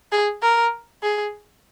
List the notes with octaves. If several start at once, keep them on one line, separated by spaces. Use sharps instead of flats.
G#4
A#4
G#4